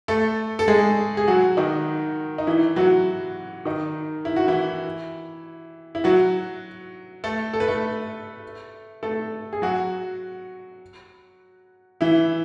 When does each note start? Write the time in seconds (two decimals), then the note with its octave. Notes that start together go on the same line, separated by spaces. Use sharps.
0.08 A3 A4
0.59 A4
0.68 G#3 G#4
1.17 G#4
1.28 F#3 F#4
1.57 D#3 D#4
2.38 D#4
2.47 E3 E4
2.76 F#3 F#4
3.65 D#3 D#4
4.25 E4
4.36 F#4
4.48 E3 E4
5.95 E4
6.04 F#3 F#4
7.24 A3 A4
7.54 A4
7.60 B4
7.68 A3 A4
9.03 A3 A4
9.53 G#4
9.62 F#3 F#4
12.01 E3 E4